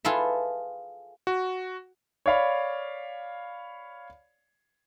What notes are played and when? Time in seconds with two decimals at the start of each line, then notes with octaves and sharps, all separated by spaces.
0.05 F4 G#4 A4 B4 E5
1.27 F#4
2.26 C#5 D5 F5 B5